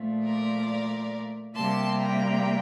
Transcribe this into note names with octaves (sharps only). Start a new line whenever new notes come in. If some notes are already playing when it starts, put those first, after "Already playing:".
Already playing: A#2 F3 A3
A#4 D5
C3 G3 A#3 A5 C6
G5 A#5